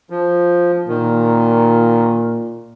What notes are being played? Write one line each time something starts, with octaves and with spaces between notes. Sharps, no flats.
F3
A#2 D#3